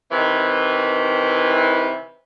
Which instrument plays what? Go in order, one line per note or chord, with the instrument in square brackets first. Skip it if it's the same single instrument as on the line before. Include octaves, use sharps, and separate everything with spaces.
[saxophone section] C3 D#3 E3